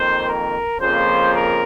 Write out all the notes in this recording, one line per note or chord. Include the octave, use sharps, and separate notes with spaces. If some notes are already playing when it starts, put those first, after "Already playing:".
Already playing: F2 D#3 A#3 C5
A#4
F2 C#3 F3 A#3 C5
A#4